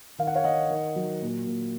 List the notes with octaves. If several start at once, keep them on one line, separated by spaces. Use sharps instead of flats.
D#3 F5
F#5
C#5 F5
D#3 D#5 F#5
D#3
F#3
A#2
A#2